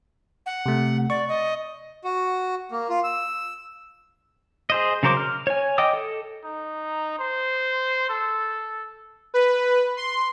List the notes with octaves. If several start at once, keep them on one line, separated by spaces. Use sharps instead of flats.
F#5
C3 A3
D5 C#6
D#5
F#4
A#3
F4
E6
G#4 C5 D#5
C#3 F#3 A#4 C5 D6
F6
C#5 G#5
D#5 G5 D6 D#6
A4
D#4
C5
A4
B4
C6